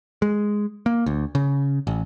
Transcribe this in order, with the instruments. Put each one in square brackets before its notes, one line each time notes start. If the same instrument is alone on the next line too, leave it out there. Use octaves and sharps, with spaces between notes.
[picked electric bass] G#3
A#3
D2
C#3
A1